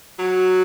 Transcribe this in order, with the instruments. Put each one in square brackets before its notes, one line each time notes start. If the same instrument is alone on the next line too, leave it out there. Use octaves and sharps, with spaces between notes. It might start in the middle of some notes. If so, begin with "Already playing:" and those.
[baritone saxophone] F#3